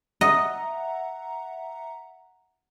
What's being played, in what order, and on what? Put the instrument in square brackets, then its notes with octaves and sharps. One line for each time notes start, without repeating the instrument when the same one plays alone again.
[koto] D#5 [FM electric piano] E5 F#5 A#5